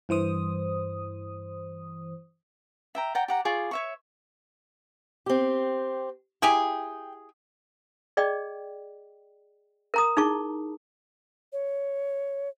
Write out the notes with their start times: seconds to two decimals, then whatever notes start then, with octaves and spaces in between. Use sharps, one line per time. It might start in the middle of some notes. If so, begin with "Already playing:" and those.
0.09 G2 E3 C5 D#6
2.95 E5 G5 A#5
3.15 D5 F#5 G5 A#5
3.28 G4 F#5 A#5
3.45 F4 G#4 D5 C#6
3.71 C#5 E5 C#6
5.26 C4 G4
6.42 E4 G4 G#4 G5
8.17 G#4 D5 D#5 G5
9.94 A#4 A#5 D#6
10.17 D#4 E4 G#4 A5 C#6
11.53 C#5